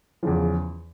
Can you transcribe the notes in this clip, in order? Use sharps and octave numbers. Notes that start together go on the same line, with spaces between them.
E2 C#3 F3